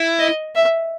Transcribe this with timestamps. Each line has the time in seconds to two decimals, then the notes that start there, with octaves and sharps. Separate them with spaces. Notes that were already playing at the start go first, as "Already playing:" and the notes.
Already playing: E4
0.19 D#5
0.56 E5